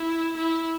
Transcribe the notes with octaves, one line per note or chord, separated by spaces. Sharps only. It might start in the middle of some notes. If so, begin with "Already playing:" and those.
Already playing: E4
E4